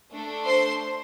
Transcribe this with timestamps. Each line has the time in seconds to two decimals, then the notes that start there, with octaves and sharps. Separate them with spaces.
0.12 A3 D4 A4
0.46 C5 C6